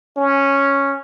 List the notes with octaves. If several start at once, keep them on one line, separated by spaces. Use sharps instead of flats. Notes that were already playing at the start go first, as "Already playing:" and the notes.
C#4